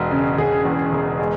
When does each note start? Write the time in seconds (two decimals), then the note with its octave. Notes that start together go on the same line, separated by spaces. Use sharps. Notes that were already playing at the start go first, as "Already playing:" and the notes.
Already playing: E1 G#3 F#4
0.11 C#3
0.38 E1 G#4
0.65 E2
0.92 E1
1.19 G#3